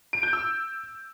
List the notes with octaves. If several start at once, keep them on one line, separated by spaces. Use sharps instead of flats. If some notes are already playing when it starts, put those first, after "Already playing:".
D7
G6
E6